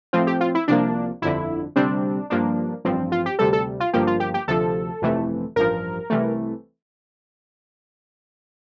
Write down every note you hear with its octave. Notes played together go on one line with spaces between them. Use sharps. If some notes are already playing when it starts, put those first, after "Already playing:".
A2 F3 C4 F4
G4
F4
E4
C2 C3 F3 A#3 D4
G1 F2 D3 E4
D2 C3 G3 C4 D4
G2 F3 A#3 D4
A1 G2 F3 C4
F4
G4
D2 C3 G3 A4
A4
F4
G1 G2 F3 A#3 G4
F4
G4
G4
D2 C3 F3 A4
G1 F2 C3 E3 A3
A1 G2 F3 A#4
C2 C3 E3 A3